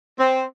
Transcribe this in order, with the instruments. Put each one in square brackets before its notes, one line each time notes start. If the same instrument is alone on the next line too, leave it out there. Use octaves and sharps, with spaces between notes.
[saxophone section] C4